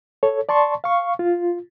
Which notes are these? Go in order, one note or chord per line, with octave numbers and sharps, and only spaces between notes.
A4 C#5
D5 A5 C6 C#6
F5 C#6
F4